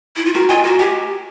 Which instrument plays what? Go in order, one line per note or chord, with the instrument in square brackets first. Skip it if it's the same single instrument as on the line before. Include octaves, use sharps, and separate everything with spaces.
[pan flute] E4
F4
[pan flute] F#4 [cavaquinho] A#4
[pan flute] F4 [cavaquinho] D#5 G#5
[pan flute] F#4 [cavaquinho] A#4
[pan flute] G4 [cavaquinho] G#5